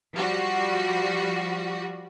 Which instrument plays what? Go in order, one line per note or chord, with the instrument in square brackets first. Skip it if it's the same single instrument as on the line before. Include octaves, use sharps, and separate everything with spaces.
[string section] F3 G3 F#4